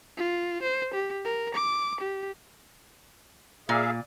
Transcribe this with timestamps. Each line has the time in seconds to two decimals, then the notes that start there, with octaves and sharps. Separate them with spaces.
0.17 F4
0.62 C5
0.94 G4
1.25 A#4
1.55 D6
2.00 G4
3.69 A#2 G#4 E5 F5